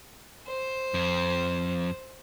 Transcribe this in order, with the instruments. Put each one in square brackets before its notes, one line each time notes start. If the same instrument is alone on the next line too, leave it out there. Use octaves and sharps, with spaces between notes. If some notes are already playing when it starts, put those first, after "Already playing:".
[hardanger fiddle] C5
[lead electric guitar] F2